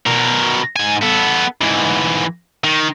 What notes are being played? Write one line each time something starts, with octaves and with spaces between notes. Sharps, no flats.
B2 A#4
G#2 G#5
B3 A4
G#2 E3
D#3